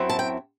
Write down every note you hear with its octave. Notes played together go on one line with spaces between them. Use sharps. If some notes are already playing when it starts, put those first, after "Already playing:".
Already playing: F#2 F#3 C4 E4
A5
G5